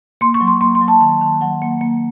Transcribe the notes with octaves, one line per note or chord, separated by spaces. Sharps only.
A#3 C6
C#6
F#3
C6
A#3 C6
C6
F#3
A5
D#3
D#3
F#3 F#5
A#3
A#3